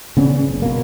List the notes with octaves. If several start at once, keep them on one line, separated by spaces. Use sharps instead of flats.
C#3 B3 C#4 D4
F#1
G1 B2 A#3